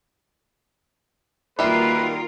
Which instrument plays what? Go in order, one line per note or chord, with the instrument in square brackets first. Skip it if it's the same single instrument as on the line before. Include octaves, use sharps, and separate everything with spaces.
[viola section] D#3 A#3 F#4 [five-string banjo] G3 E5 [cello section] F4 A#4 [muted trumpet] B4